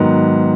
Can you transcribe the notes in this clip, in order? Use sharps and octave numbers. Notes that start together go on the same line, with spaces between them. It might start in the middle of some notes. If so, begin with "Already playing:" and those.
Already playing: G#2 D#3 F#3 B3